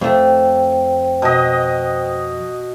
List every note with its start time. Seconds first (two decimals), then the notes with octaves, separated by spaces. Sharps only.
0.01 F2 A3 C5 G5
1.22 B2 D#5